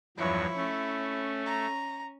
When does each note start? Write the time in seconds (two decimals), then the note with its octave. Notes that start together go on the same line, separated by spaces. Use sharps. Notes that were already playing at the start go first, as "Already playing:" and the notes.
0.17 E2 G2 F3 F#3 E4 C#5
0.57 A3 C#4
1.46 A#5